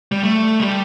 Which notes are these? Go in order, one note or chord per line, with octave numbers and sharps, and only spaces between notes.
G3
A3
G3